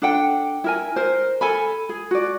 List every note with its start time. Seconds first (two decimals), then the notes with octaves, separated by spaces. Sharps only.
0.02 D4 A4 F#5 G5
0.64 E4 A#4 G#5
0.96 A#4 C5
1.41 A4 G#5 B5
1.89 G#4
2.11 F#4 D5